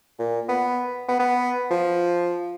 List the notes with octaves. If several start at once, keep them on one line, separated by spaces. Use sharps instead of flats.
A#2
B3
B3
B3
F3